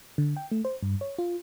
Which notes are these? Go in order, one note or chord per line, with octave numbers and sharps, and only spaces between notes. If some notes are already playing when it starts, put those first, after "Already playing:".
D3
G5
A3
C5
G2
C#5
F4